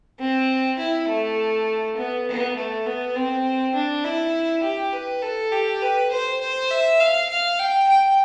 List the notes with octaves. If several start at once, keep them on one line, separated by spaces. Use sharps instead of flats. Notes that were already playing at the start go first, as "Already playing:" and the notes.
C4
E4
A3
B3
B3
A3
B3
C4
D4
E4
G4
B4
A4
G4
B4
C5
C5
E5
F5
F5
G5
G5